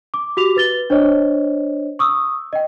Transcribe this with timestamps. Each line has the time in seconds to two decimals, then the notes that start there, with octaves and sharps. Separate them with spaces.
0.14 D6
0.37 F#4 G4 D6 F7
0.56 B4 A6 G7
0.90 D4 C5 C#5 D#5
1.99 C#6 D#6 E6
2.53 D#5 G5